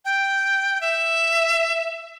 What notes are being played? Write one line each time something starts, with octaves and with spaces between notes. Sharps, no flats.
G5
E5